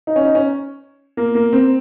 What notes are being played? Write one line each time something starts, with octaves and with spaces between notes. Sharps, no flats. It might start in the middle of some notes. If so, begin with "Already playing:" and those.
D#4
C#4
D#4
C#4
A#3
A#3
C4